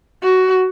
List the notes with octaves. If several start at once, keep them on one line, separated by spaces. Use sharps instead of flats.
F#4